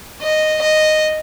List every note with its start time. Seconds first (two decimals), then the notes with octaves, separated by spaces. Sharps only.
0.23 D#5
0.62 D#5